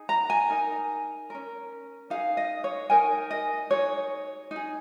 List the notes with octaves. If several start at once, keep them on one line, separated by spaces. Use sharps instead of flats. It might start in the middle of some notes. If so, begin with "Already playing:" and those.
Already playing: D#4 G#4
A#5
G#5
D#4 A#4
C#4 A#4
D#4 G#4 F5
D#5
C#5
D#4 A#4 G#5
D#5
D#4 G#4 C#5
D#4
G#4